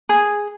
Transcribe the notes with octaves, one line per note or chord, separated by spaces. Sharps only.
G#4